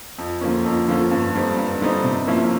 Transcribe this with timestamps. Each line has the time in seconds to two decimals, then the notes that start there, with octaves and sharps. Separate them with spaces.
0.18 F2
0.41 D3 F3 A#3 C#4
0.65 F2
0.88 D3 F3 A#3 C#4
1.11 G2
1.34 D3 G3 C4 D#4
1.57 G2
1.81 D3 G3 C4 D#4
2.04 C3
2.27 F3 A#3 C#4 E4